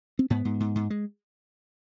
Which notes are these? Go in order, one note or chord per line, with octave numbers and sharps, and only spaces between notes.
C4
G#2 B3
G#2
G#2
G#2
G#3